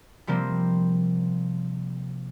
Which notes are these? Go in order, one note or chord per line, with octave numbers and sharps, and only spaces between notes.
C3 F3 G3 A#3 C4